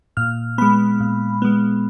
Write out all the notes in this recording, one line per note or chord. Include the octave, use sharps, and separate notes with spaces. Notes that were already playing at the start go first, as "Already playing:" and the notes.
A#2 F6
G#3 B3 B5
A#2
G#3 B3